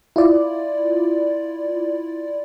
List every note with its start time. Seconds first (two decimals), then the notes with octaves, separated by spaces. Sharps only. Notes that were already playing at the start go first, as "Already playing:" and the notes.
0.16 E4 F4 D5